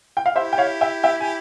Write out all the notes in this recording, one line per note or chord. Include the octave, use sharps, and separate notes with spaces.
G5
F5
E4 G4 C5 E5
G5
C#5 F5
E5 G5
E5 G5
G#5